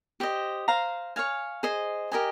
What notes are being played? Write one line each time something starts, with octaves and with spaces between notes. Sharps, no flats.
G4 C5 D#5
C5 F5 A#5
C#5 F5 G#5
G#4 C5 D#5
G4 A#4 D#5 G#5